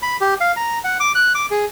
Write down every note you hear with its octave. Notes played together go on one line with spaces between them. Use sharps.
B5
G4
F5
A#5
F#5
D6
F#6
D6
G#4